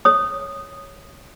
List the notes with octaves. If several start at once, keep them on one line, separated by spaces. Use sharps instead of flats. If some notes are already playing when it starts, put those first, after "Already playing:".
C#5 D#6